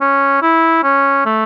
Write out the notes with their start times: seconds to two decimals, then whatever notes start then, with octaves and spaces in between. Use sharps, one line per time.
0.01 C#4
0.42 E4
0.83 C#4
1.26 A3